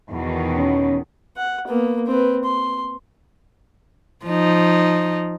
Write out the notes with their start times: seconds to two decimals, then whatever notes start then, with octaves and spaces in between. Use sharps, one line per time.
0.11 E2 B2 D#3
0.57 C#4
1.37 F#5
1.68 A#3 B3
2.07 C4 B4
2.44 C6
4.26 F3 D#4